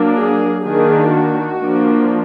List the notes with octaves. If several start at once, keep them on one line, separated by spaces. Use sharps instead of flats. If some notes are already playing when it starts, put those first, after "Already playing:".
Already playing: F#3 A#3 D4
G#4
D#3 A#3 D4 G#4
F#4
F3 A#3 D4